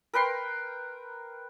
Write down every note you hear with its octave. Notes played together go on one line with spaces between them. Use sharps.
A#4 B4 G5 C6